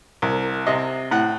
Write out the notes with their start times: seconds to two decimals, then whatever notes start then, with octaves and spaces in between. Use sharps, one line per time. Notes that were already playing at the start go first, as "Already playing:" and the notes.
0.22 C2 A#4
0.67 C3 D#5
1.11 A2 F#5